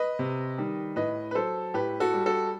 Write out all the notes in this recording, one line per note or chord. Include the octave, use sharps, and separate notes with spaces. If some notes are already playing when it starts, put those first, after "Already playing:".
Already playing: B4 D#5
C3
D#3 G3
A2 B4 D#5
B4
F#3 A4 C5
A2 G4 B4
F#4 A4
G3
F#4 A4